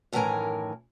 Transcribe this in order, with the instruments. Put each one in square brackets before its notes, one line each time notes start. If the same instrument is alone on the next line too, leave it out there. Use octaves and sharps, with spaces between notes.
[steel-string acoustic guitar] F#2 A2 D#3 E3 A#4 G#5